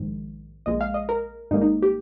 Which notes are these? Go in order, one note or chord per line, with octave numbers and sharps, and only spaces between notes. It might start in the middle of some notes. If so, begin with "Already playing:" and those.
Already playing: A#1 G#2 D#3
A#1 A#2 G#3 D#5
F5
D#5
A#4
G#1 G#2 G3 A#3 D#4
D#4
G4